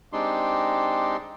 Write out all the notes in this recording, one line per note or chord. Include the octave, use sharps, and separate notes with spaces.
G#3 C4 D4 D#4 G4 C6